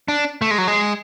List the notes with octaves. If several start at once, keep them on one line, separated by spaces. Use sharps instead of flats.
D4
A3
G#3
F#3
G#3